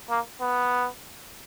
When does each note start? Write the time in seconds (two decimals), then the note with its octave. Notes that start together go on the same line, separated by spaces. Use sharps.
0.10 A#3
0.41 B3